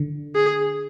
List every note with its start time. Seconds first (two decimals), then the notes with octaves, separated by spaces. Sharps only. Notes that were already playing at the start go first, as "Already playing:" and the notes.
Already playing: D3
0.35 G#4